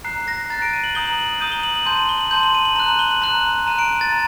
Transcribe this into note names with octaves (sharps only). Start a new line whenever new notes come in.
A#5 F#6 C7
A#6
A#5 F#6 A6
D7
D#7
F#7
A#5 D#6 G6 G7
F#7
F#7
F#7
A#5 D#6 G6 D#7
G7
F#7
F#7
A5 C6 G6 F#7
F#7
G7
F#7
A5 C6 G6 F#7
F#7
D#7
F#7
A#5 F#6 F#7
F#7
G7
F#7
A#5 F#6 F#7
A#5 F#6 D#7
D7
A6
A#5